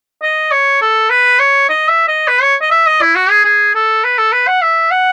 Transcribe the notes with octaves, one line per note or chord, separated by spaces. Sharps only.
D#5
C#5
A4
B4
C#5
D#5
E5
D#5
B4
C#5
D#5
E5
D#5
E4
F#4
G#4
G#4
A4
B4
A4
B4
F#5
E5
F#5